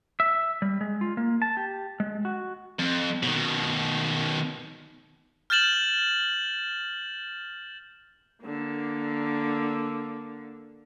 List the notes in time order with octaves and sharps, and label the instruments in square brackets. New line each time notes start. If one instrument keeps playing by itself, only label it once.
[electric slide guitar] E5
G3
G#3
F4
A#3
A5
G4
G#3
F#4
[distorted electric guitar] F2
B2 D#3
[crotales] F6 G6 A6 E7 F#7
[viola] D3 A#3